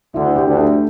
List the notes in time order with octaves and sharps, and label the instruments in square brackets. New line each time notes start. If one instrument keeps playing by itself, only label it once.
[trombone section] D2 D3 [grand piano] E4
[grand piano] G4
[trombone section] D2 D3
[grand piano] A3